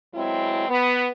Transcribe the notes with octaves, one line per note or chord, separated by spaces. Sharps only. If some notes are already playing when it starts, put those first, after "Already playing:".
E2 F#3 G#3 C4 E4
B3